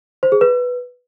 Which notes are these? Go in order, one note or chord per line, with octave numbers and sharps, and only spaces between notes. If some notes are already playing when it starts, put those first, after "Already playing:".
C5
G#4
B4